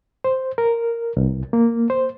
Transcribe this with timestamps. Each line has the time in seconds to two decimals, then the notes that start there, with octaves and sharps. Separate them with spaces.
0.24 C5
0.58 A#4
1.17 C2
1.53 A#3
1.90 C5